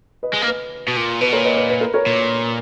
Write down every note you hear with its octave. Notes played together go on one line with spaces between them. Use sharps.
B4 D#5
G#3
A#3
B4
B2
A#2
B2 B4
A#2 A#4 C#5
B4 D#5
B4
B4
A#4
A#4 C#5
A#2